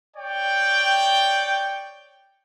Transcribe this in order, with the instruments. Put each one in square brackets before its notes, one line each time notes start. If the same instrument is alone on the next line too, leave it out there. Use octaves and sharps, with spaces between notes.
[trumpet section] C#5 D5 G5